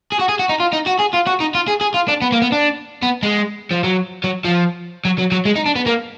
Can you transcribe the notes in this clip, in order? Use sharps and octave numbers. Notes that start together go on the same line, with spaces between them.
G#4
F#4
G#4
F#4
D#4
F4
D#4
F#4
G#4
F4
F#4
D#4
F4
G#4
G#4
F4
D4
B3
A#3
B3
D4
B3
G#3
F3
F#3
F#3
F3
F#3
F#3
F#3
G#3
D#4
D4
B3
A#3